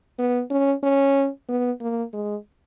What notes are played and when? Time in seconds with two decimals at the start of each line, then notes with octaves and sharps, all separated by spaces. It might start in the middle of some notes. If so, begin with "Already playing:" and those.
0.19 B3
0.51 C#4
0.83 C#4
1.48 B3
1.80 A#3
2.13 G#3